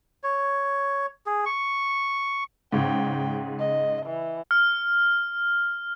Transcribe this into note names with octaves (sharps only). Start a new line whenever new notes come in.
C#5
G#4
C#6
G#2 C#3 G5
D#5
E3
F6